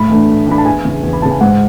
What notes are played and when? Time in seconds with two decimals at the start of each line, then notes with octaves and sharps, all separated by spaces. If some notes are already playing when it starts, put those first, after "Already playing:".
Already playing: A2 B5
0.09 E3 A3 D4
0.28 A2
0.47 E3 A3 D4 B5
0.58 A5
0.65 E2 G#5
0.85 C#3 E3
1.03 E2
1.13 B5
1.22 C#3 E3 A5
1.31 G#5
1.40 G#2 F#5